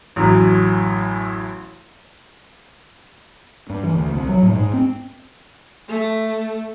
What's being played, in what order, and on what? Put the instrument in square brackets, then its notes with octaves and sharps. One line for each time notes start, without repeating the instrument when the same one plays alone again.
[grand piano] A1 F#2 A2 F#3
[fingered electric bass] G2
E3
D2
C2
F#3
A2
G#2
C4
[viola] A3